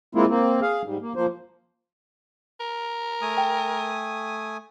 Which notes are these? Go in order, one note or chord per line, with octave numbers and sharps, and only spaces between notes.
G#3 A#3 C4 E4 F4
A#3 C4
G#4 F5
G#2 G3
A#3
F3 A#3 C5
A#4
A3 G#5 D#6
G5